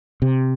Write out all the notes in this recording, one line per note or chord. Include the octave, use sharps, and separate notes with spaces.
C3